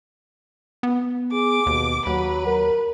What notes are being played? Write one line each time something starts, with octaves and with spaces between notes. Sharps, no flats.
B3
G#4 D6
D#2 B2
D#2 F#3 B4
A#4